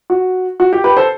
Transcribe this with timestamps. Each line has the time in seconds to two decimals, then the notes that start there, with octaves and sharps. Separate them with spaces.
0.10 F#4
0.60 F#4
0.73 G4
0.84 G4 B4
0.97 A4 C5